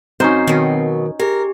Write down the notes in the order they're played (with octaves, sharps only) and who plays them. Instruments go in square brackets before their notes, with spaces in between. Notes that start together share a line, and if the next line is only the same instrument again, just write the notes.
[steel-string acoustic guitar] F#2 [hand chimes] C4 A#5 C7 [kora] C#4 D#4 C5
[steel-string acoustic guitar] B2 F#3 [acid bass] D#3
[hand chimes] G4 G#4 [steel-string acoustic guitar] A#4